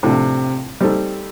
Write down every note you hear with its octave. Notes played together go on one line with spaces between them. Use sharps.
A2 C3 F3 A3 D4
G3 C4 D#4 A4